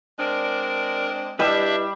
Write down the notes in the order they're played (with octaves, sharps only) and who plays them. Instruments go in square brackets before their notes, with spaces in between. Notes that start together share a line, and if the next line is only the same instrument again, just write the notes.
[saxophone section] G#3 C4 D4 [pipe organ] A#4
[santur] G3 G4 E6 [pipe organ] D4 E5 [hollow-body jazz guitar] E4 B4 D#5